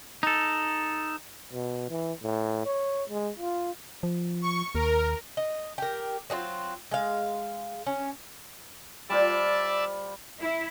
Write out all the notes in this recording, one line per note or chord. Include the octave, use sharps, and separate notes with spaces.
D#4 A4
B2
E3
A2
C#5
G#3
F4
F3
C#6
D#2 A#4
D#5
G4 A#4
F#3 C4 D#4 F4
G#3 F5
C#4
G3 F4 C5 D5 E5 A5
E4